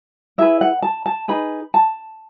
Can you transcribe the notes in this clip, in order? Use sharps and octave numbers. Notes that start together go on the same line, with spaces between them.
E4 G#4 B4 E5
F#5
A5
A5
D#4 G#4 B4 B5
A5